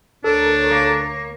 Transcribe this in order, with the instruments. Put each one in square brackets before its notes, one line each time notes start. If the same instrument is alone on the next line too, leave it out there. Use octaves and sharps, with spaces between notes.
[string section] D2 A#4 C#5 [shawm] D4 [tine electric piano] A4
[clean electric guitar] A#3